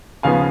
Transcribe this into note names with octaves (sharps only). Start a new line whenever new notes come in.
D#2 C#3 F3 B3 F5 G#5